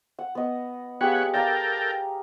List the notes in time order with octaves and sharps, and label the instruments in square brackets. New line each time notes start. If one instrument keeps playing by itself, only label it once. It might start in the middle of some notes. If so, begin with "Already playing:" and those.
[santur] F#5
B3 D#5
[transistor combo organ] B3 C#5 F#5 [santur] G4 G#4 F5
[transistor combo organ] A4 A#4 G5 [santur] D5 F5 A#5